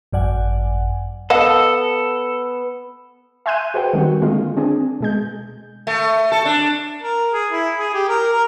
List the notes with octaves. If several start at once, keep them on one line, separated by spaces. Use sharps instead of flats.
G#1 F#2 D5 F#5 G#5
B3 A4 D#5 F5 F#5
E5 G#5 C6 F#6 G6 D#7
F#4 G#4 B4 C5 F#5 G5
D#3 G3 C4 F#4
D3 G#3 A#3 F4
C4 D4 G#4
B2 G#3 G6
A3
A4
D4
A#4
G#4
E4
G#4
G4
A#4
A#4